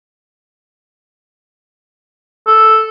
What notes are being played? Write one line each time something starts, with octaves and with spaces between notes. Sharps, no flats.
A4